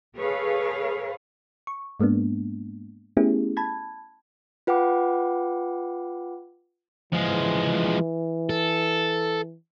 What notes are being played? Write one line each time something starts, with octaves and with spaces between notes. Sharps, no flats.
G#4 A4 B4 C#5 F5
C#6
G#2 G#3 A#3 B3 D4
A3 B3 C#4 E4 G4 G#4
A5 B5 G#6
F4 B4 F#5 G5 D6
E3 F3 G#3
A4